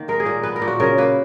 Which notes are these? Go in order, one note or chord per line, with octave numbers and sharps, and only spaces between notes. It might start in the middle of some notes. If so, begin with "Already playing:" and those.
Already playing: D#3 A#3
G#3 A#4
G#4
A#2 A#4
B3 B4
A#4
A#2
F#4
C#3 A#4
A#3 B4